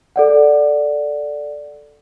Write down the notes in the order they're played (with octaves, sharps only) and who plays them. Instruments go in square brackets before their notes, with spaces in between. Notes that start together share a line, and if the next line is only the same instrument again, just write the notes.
[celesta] A4 D5 F#5